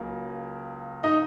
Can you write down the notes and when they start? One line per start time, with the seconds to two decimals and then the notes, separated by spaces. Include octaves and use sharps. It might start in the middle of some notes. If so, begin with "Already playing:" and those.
Already playing: C#2 C#3 F#3 A#3
1.03 D#4 D#5